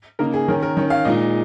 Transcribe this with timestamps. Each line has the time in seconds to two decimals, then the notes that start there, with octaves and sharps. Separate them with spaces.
0.19 C#3 A#3 D#4 A#4
0.34 G#4
0.48 D#3 C#4 A#4
0.62 A#4
0.77 D#3 C#4 C#5
0.90 F5
1.05 A#2 G#3 D#4 D#5